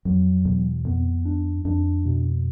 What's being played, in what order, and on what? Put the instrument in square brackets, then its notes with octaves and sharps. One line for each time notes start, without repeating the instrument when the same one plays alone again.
[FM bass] F2 [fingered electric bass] F#3
[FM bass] E2 [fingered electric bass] B2
[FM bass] F2 [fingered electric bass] B3
[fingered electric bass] D4
[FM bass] F2 [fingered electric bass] D4
[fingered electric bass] B2